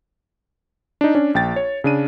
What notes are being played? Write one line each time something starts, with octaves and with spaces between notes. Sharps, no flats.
D4 D#4
C#4 D4
A#1 G5 A6
C#5
C#3 D4 D#7